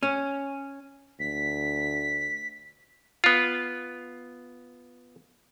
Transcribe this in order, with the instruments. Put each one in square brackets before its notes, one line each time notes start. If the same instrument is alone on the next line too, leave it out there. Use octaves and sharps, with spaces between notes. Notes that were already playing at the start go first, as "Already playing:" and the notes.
[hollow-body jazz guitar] C#4
[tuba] D2 [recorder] B6
[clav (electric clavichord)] B3 F4